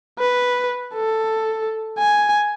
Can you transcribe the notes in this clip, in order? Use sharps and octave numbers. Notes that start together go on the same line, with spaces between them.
B4
A4
G#5